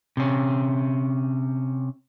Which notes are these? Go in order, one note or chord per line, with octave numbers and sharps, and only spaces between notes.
C3 C#4